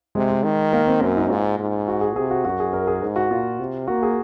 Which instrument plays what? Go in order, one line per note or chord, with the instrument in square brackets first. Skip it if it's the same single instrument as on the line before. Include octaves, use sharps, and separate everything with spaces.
[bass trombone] C3 [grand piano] G#3
[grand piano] G#3
[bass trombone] D#3
[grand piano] A#3
C4
[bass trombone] F#2 [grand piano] C#4
[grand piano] D#4
[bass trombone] G#2 [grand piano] F4
[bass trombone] G#2
[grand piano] F#4
G#4
[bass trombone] C3 [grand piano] G#4
[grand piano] F#4
[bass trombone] F#2 [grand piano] F#4
[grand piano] G#4
A#4
G#4
[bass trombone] G#2
[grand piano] F#4
[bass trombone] A#2 [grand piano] F4
[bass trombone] C3
[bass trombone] A#3 [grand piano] F#4
[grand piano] G#4